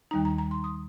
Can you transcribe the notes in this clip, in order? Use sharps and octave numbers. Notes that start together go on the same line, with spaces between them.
D#2 D#3 G3 D#4 A#5
A#5
A#5
C6
D#6